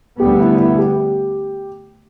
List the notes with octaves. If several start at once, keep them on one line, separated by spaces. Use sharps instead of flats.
D2 D3 G3 B3 G4
E4
E4
G4